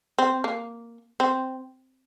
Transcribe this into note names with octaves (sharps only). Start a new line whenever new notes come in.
C4
A#3
C4